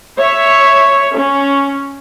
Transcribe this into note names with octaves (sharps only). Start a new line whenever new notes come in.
C#5 E5
C#4